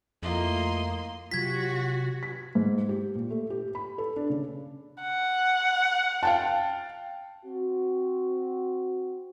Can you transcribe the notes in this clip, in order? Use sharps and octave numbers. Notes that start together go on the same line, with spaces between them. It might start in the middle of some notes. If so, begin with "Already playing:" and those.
F2 A3 A#3 E4 F4 D#5 C6
C3 F#3 F4 F#4 G#6 B6
B6
G#2
G4
A#2
A3
G4
B5
A4
D4
C#3
F#5
F5 G5 A5
C4 F#4